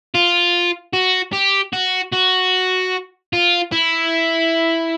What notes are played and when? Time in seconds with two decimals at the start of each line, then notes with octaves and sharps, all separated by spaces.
0.14 F4
0.93 F#4
1.33 G4
1.73 F#4
2.13 F#4
3.33 F4
3.72 E4